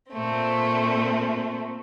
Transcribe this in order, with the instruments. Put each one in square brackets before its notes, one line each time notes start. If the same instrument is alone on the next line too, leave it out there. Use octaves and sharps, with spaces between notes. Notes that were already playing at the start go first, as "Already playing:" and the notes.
[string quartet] A#2 A3 C4